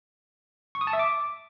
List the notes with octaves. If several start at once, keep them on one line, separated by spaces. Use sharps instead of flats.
C#6
D#6
A5
E5
D6